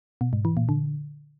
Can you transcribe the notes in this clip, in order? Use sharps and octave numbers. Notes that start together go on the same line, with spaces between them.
B2
G#2
E3
A#2
D3